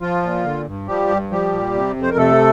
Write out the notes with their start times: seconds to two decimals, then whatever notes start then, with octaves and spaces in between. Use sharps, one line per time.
0.01 F3 F4
0.22 A#2
0.45 D3
0.66 G2
0.88 F3 G3 G4
1.09 G2
1.30 F3 G3 G4
1.53 A#2
1.74 C3
1.96 F2
2.03 C5
2.10 A#4
2.17 C3 A3 A4